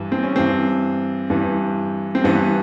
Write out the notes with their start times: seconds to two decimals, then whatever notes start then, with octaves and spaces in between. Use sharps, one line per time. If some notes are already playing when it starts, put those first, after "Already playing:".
Already playing: G2 E3
0.12 C4
0.23 C#4
0.36 G2 E3 C4
1.30 G2 E3
2.15 C4
2.24 G2 E3 B3